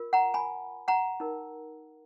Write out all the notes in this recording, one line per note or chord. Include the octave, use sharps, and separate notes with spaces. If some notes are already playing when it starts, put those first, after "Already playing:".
Already playing: F4 A#4
F#5 A#5
G#5 B5
F#5 A#5
D#4 A#4